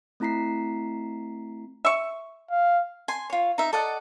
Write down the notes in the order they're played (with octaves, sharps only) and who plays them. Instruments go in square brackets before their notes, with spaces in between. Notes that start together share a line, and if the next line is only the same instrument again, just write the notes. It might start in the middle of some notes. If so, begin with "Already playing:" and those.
[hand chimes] A3 C4 E4 A#5 B6 C7
[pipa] E5 C#6
[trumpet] F5
[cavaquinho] G#5 C6
F4 C#5
D#4 E5
A4 D5 D#5 F#5